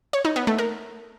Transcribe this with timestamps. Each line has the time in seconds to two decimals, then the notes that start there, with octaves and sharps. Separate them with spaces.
0.13 C#5
0.25 D#4
0.36 B3
0.47 A3
0.58 A#4